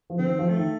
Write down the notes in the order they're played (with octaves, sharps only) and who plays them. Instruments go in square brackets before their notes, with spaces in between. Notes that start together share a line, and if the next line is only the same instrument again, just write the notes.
[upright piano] F3
[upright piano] D3 [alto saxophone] C4
[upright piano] D#3
F3
[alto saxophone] A3
[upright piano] D#3